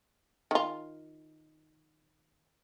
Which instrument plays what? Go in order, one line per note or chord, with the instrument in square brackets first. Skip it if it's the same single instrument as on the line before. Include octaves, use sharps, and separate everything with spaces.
[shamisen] D#3 F4